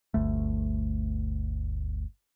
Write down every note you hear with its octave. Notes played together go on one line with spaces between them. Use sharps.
G1 D2 A3